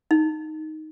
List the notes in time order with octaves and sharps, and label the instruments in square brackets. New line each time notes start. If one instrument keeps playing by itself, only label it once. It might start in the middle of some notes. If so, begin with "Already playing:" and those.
[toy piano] D#4